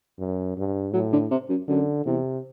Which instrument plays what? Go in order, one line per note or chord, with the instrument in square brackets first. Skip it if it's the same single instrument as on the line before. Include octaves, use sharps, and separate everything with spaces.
[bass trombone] F#2
G2
[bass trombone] A2 [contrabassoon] F#3
[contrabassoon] D3
C3
F#2
[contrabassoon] F#2 [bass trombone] D3
[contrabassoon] E2 [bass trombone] C3